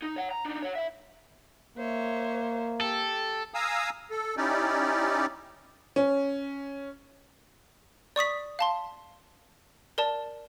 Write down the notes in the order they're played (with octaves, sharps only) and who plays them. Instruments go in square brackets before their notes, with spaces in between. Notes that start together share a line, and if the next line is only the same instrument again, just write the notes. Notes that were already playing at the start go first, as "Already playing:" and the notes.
[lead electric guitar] D#4
C#5 F#5
A#5
D4 D#4
C#5 F#5
E4 E5
[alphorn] A#3 [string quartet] C5 C#5 E5
[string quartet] G4 [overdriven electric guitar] A4
[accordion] F5 G#5 A#5 D#6 E6
A4
C#4 D#4 E4 G4 D5
[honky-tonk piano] C#4
[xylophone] D5 C#6 D#6 B6
F5 A5 C6
A#4 D5 A5